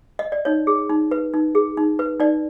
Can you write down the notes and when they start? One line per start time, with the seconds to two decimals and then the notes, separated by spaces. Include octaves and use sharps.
0.19 D#5
0.32 D5
0.45 D#4 C#5
0.67 G#4
0.90 D#4
1.11 B4
1.34 D#4
1.55 G#4
1.77 D#4
1.99 B4
2.20 D#4 D5